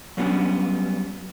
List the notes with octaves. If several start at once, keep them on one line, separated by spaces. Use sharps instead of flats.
F#3 G3 A#3 B3 C#4 D4